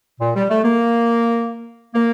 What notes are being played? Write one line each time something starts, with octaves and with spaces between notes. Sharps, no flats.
A#2
G3
A3
A#3
A#3